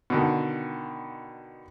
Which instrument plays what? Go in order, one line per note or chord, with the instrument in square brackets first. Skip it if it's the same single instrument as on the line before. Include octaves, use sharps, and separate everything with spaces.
[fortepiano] B2 D3 D#3